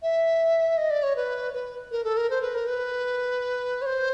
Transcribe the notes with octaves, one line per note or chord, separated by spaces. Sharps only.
E5
D#5
D5
C#5
B4
B4
A#4
A4
A#4
C5
B4
A#4
B4
C#5
C5